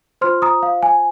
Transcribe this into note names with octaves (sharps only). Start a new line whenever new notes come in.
F4 C5 C6 F6
A#5 D#6
F5
G#5